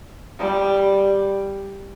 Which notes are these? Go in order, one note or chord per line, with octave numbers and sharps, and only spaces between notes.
G3